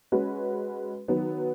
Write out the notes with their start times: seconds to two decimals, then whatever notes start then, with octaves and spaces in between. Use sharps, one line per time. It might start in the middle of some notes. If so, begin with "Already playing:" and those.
0.12 G#3 C#4 F#4 B4
1.08 D#3 F#3 B3